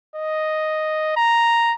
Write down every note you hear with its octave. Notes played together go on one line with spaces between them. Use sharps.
D#5
A#5